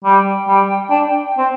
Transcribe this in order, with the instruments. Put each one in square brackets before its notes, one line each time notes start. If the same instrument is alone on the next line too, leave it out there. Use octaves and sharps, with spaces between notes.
[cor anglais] G3 [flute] G5
[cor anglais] G3
D4
C4